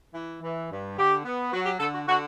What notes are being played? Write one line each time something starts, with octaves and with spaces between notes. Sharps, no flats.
E3
E3
G2
D3 G4
B3
F#3 F#4
G4
D3 A4
F#4
D3 F#4